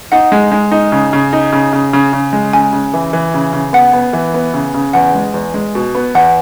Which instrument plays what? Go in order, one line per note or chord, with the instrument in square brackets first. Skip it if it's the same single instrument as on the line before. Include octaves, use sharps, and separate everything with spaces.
[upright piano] D#4 [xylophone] F#5
[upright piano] G#3
G#3
D#4
C#3
C#3
D#4
C#3
C#3
C#3
C#3
G#3
[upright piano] C#3 [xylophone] G#5
[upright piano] C#3
E3
E3
C#3
C#3
[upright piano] B3 [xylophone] F#5
[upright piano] B3
E3
B3
C#3
C#3
[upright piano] E2 [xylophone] F#5
[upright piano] G#3
E2
G#3
B2
B3
[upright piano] E2 [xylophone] F#5